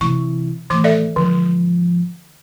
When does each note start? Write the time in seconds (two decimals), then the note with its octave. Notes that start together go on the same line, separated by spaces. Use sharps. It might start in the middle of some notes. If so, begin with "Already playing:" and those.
0.01 C3 E3 C#6
0.70 A2 D#3 E3 D6
0.84 A4 D5 E5
1.16 G#2 D3 F3